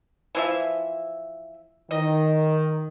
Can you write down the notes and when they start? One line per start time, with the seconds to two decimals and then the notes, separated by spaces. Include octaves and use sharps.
0.35 E3 F3 E5
1.91 D#3 D#5